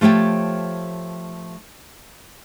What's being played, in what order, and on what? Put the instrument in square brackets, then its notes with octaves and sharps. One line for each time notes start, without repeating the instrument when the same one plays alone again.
[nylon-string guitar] F3 A3 G4 C#5 G5